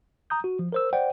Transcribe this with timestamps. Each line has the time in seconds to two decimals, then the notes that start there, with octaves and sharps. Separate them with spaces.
0.30 A#5 D#6 G6
0.44 F#4
0.59 F3
0.72 A#4 C5 E6
0.93 C5 D5 F#5 G5